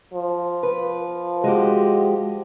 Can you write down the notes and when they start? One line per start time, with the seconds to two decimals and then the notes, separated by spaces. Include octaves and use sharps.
0.13 F3
0.63 B4
1.44 G#3 F#4 G4